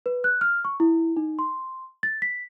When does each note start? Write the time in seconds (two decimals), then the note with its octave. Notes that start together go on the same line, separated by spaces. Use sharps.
0.06 B4
0.24 F#6
0.41 F6
0.65 C#6
0.80 E4
1.17 D#4
1.39 C6
2.03 A6
2.22 B6